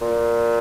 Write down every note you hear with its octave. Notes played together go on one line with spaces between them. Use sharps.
A#2